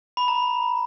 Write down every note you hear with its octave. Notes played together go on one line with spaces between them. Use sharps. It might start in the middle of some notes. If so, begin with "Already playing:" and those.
B5
A#5